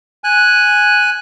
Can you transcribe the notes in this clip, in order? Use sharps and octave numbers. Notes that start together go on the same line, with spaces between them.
G#5 F#6